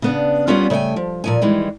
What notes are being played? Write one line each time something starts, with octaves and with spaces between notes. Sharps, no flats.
C#3 B3 D4
G3 A#3 B3 C#4 F4 G4
C#3 A3 A#4 G5 G#5
F3
A#2 F3 G#5
D#3 E3 G3 G#3